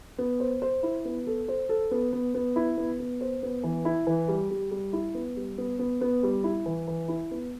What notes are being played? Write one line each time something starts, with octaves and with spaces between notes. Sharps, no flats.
B3
C5
C5
E4
B3
A4
C5
A4
B3
B3
B3
E4
B3
B3
C5
B3
E3
E4
E3
G3
G3
G3
E4
B3
G3
B3
B3
B3
G3
E4
E3
E3
E4
B3